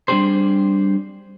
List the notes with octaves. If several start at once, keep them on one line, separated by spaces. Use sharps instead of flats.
G3 C4 D4 G4 G#4 C5